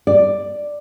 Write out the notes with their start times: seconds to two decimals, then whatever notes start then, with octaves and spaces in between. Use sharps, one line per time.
0.07 D5